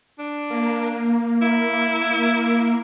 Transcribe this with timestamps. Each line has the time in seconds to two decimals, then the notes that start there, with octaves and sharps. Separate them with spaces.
0.19 D4
0.50 A#3
1.42 E4